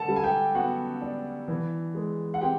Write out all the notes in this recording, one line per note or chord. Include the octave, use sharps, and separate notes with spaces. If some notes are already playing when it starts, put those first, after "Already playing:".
Already playing: D3 A4 A5
G3
G#5
G4 G5
B3 F#4 F#5
D4
E3
G#3
F#5
C4 G4 G5